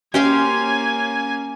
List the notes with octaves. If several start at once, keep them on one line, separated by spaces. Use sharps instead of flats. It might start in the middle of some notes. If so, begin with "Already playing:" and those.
A#3 C#4 G4 C5 F5 G#5